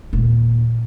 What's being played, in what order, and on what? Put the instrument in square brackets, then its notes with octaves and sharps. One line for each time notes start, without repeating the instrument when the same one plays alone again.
[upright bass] D#2 A#2